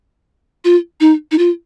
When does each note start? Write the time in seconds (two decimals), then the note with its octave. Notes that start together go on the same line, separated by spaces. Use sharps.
0.65 F4
1.00 D#4
1.31 D#4
1.38 F4